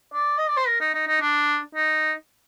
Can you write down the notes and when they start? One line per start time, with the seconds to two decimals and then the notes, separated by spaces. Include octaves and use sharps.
0.13 D5
0.38 D#5
0.48 D5
0.57 C5
0.67 A#4
0.81 D#4
0.94 D#4
1.07 D#4
1.21 D4
1.75 D#4